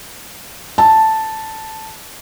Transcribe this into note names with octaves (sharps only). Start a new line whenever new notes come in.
A5